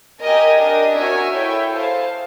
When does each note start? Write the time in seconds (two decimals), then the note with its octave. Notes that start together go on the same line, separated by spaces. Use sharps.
0.21 G4 A#4 D#5 G#5
0.60 D4 G4 A#4 D#5
0.97 F#4 A#4 C#5 E5 G#5
1.34 E4 A4 C#5 E5 G5
1.73 G#4 C5 F5 A5